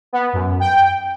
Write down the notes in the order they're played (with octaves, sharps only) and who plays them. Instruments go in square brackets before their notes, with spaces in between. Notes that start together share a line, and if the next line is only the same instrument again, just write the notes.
[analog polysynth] B3
F#2
G5